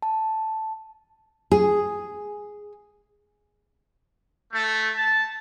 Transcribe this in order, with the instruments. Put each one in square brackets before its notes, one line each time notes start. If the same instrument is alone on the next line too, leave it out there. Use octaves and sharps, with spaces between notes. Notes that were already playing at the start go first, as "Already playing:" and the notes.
[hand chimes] A5
[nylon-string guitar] G#4
[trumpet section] A3
A5